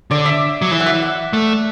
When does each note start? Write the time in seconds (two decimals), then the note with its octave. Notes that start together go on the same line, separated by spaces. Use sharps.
0.11 D3 D5
0.25 E5
0.62 F#3
0.71 E3 E5
0.80 F#5
0.86 E5
1.02 F#5
1.33 A3